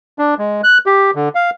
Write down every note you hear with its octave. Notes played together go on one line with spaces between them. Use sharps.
D4
G#3
F#6
G4
D3
F5